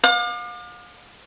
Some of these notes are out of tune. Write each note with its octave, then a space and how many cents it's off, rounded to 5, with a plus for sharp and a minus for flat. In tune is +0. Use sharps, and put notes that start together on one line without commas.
F5 +40 D6 +40